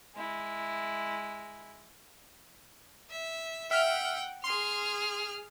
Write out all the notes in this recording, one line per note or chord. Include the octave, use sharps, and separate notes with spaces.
G#3 E4
E5
E5 F#5 G5 F6
G#4 C6 F6